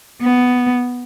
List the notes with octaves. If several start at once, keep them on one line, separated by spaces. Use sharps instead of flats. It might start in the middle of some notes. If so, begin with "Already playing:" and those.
B3